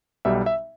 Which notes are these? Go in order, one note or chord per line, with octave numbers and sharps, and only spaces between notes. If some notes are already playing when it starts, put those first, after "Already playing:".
B1 B2 G3 E5
E5